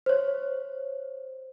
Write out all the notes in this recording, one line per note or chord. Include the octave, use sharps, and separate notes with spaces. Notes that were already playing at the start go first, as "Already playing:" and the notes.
C5 C#5